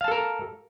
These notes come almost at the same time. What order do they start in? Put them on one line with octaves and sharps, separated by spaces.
F5 A5 A4 A#4